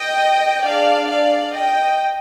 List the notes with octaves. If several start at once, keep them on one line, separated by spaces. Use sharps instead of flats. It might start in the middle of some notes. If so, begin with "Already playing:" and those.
Already playing: D#5 G5
D4 G#4 D5 F5
D5 F5
D#5 G5